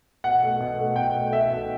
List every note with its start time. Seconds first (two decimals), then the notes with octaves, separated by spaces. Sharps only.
0.24 B2 F#5
0.42 A3
0.60 B2
0.78 A3
0.96 B2 G5
1.15 A3
1.32 A3 E5
1.51 B2